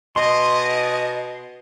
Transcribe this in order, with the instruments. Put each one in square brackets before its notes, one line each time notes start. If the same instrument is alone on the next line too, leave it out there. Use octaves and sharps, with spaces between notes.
[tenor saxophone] B2 [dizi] D#5 [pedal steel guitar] C6